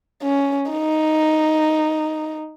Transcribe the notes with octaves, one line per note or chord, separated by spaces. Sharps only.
C#4
D#4